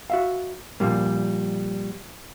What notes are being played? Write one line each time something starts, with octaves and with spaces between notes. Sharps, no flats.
F#4 E5 F5
A#2 D3 F3 G3 A#3